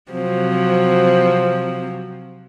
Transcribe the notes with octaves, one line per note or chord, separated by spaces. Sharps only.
C3 F3 F#3 C4